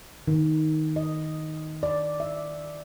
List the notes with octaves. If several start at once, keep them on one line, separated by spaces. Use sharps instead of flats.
D#3
D#5
D5
E5